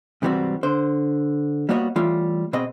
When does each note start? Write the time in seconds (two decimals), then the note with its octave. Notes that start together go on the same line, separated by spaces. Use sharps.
0.22 G#2 C3 E3 G3 C4 F#4
0.63 D3 C5
1.69 G3 A#3 B3 F#4 C#5 D#5
1.96 E3 G3 A3 F4 C#5
2.53 B2 B3 C4 G#4 D#5